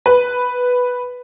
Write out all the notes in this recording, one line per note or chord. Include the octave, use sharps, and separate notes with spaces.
B4